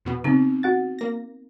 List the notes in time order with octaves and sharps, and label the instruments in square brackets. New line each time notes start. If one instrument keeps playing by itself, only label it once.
[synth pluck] E2 B2 B3
[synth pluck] C#3 [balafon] B3 C4 D#4
[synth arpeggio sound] F#4 F#5 A6
[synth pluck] A#3 A#6